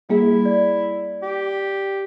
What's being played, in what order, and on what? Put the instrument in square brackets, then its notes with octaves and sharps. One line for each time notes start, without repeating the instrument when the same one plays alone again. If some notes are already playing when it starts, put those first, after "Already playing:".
[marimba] G3 A#3 G#4 [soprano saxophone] E4
[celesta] D5
[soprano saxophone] G4